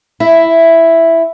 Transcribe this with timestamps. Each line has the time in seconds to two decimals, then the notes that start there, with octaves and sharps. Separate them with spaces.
0.20 E4 E5